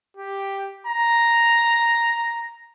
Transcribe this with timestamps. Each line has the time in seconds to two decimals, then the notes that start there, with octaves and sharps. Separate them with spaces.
0.17 G4
0.87 A#5